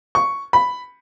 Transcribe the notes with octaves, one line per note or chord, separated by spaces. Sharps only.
C#6
B5